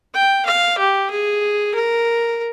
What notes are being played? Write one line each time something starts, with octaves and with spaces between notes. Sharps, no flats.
G5
F5
G4
G#4
A#4